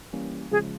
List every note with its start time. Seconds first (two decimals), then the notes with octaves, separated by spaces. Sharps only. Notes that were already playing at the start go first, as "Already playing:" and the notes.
0.13 E3 G3 A#3 C#4
0.51 C#3 F3 G#3 G#4